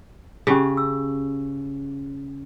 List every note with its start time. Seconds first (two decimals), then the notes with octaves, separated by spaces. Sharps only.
0.47 C#3 C#4 G4 G#4
0.77 E6